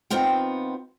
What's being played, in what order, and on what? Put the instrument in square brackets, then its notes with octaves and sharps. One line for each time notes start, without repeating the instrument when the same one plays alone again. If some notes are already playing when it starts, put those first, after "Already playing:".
[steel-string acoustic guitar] D#3 B3 C4 F4 G5